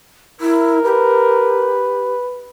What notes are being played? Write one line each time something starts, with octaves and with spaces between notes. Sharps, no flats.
E4 A#4
G4 B4